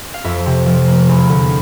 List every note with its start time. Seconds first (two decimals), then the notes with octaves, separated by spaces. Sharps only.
0.14 F5
0.24 F2 E5
0.46 C3
0.66 F3
0.88 A#3
1.09 E2
1.30 D3